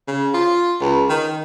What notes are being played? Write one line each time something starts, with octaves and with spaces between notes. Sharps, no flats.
C#3
F4
C#2
D#3